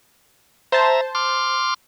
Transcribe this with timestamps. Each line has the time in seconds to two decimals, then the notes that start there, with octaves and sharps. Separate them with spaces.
0.72 C5 E5 A5 A#5
1.15 C6 D6 F6